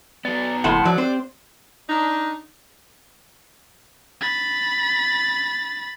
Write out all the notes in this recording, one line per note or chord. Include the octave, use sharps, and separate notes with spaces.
F#3 B3 D5
F#1 F2 A2 F#5 A5 C6
F3 F#3 D5
C4 G4 C5
D4 D#4
B5 A6